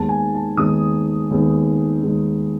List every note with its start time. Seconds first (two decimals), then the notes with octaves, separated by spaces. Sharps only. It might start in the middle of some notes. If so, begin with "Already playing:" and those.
Already playing: D#2 D#3 G#3 B3 A5
0.09 G#5
0.34 A5
0.57 D#2 D#3 G#3 B3 D#6
1.31 D#2 D#3 G#3 B3
2.03 D#2 D#3 G#3 B3